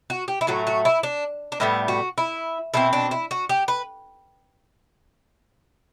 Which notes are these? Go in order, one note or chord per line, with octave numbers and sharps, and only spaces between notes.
F#4
G4
E4
A2 F#3 A3 F#4
F#4
E4
D4
D4
A2 G3 B3 E4
F#4
E4
B2 A3 C4 E4
D4
E4
F#4
G4
B4